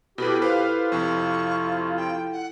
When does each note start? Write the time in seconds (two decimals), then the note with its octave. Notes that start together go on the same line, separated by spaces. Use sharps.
0.18 B2 E4 G4 A4 B4 B5
0.42 F4 G4 B4 C5 F5
0.92 F2 C3 C#6
1.97 G5
2.33 F#5